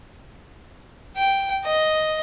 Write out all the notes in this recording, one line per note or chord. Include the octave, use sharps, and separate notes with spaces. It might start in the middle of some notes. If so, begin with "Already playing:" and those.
G5
D#5